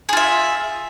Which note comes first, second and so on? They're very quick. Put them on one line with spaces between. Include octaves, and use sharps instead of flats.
G#4 F4 E5